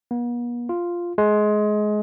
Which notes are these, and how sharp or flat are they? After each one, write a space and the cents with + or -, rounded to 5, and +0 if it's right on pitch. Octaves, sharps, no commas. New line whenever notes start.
B3 -45
F4 +0
G#3 +20